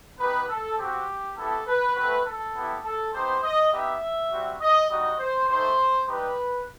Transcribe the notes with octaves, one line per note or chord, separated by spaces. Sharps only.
B3 D#4 G4 B4
A4
C4 F#4 G4
B3 E4 G4 A4
B4
A3 C4 F#4 B4
A4
B3 E4 G4
A4
B3 D#4 G4 C5
D#5
B3 D#4 G4 E5
G3 C4 F#4
D#5
G3 D#4 F#4 D#5
C5
A3 D#4 G4 C5
G3 D#4 G4 B4